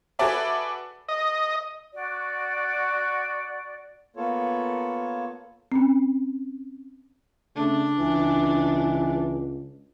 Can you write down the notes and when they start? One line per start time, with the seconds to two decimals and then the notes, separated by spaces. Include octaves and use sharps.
0.19 F#4 G#4 A4 B4 D5 E5
1.09 D#5
1.93 F#4 D5
4.16 A#3 B3 F4 A4 C#5
5.72 C4 C#4
7.56 C#3 A3 D4
7.99 C#2 E3